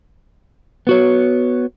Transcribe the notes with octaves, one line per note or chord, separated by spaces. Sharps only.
B3 F#4 C#5